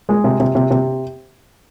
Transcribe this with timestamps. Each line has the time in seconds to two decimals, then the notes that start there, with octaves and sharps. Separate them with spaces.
0.09 G#3
0.24 C3
0.40 C3
0.55 C3
0.71 C3